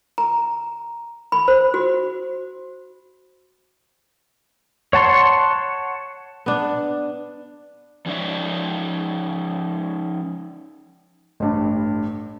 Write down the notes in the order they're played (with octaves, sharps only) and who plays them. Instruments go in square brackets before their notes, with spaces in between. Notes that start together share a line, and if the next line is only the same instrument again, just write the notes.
[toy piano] A#5
B5
C5
F#4
[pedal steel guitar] C#5 F#5 A5 C6 C#6
[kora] B3 D4
[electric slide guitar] F3 C#4 D#4 B4 D5 E5
[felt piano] A1 G2